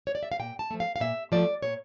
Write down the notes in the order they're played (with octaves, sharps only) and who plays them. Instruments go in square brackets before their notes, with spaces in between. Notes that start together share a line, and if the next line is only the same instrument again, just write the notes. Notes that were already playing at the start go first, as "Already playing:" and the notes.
[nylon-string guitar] C#5
D5
E5
F5
A#2 G5
A5
F3 A3
F5
F5
A#2 E5
F3 A3 D5
A#2 C#5